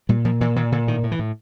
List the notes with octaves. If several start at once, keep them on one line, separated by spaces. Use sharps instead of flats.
A#2 G3
A#2 F3
A#2 E3
A#2 D#3
A#2 D3
A2 D#3
A2
E3
A2